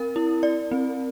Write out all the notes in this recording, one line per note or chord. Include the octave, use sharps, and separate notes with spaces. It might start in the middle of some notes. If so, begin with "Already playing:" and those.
Already playing: C4 A#4
E4
D5
C4